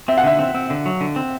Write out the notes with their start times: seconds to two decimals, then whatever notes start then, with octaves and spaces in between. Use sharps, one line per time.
0.08 C4 E5
0.18 F#5
0.24 D3 E5
0.39 C4
0.54 C4
0.70 D3
0.86 F#3
1.01 D3
1.16 C4